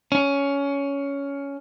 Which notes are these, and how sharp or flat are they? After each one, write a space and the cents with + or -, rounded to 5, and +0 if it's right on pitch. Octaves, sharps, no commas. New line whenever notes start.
C#4 +15